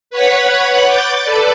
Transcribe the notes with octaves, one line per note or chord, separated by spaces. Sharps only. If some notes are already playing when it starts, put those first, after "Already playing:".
B4 C#5 F#5 B5
D6 G6 A6
A4 B4 D5